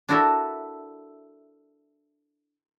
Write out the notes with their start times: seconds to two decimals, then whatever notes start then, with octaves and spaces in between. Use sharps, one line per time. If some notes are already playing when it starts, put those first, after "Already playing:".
0.09 D4 E4 F#4 A4 A#4 E5